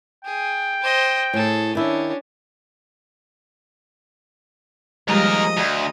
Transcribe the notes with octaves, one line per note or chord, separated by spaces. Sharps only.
G#4 G5
C5 D#5
A2 G#4 A4
D#3 C#4 D4 E4
D#2 F3 G3 G#3 A#4 D#5
D2